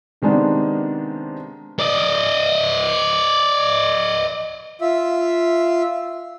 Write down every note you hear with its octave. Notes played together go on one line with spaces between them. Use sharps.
C3 D#3 G#3 B3 D4
D5 D#5
F4 E5